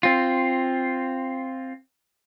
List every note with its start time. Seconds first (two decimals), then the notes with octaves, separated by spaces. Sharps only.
0.03 C4 F4